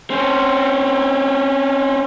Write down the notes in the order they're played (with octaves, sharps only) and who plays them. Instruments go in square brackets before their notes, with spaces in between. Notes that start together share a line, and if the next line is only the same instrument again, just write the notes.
[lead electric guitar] C4 C#4